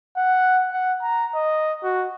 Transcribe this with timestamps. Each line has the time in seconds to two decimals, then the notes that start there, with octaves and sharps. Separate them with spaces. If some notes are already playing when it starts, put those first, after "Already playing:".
0.17 F#5
0.72 F#5
1.02 A#5
1.34 D#5
1.83 F#4